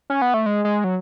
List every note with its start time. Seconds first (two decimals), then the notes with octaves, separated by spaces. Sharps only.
0.10 C#4
0.22 B3
0.34 A3
0.46 G#3
0.65 G#3
0.84 F#3